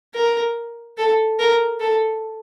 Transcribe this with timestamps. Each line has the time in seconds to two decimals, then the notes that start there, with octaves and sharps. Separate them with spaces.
0.14 A#4
0.98 A4
1.39 A#4
1.80 A4